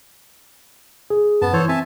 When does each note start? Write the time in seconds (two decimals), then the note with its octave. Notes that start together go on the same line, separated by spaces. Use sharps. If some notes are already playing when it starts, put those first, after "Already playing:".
1.10 G#4
1.42 F#2 B3 A5
1.53 E3 A4 C5 C#5
1.69 C4 E5 G#5 A5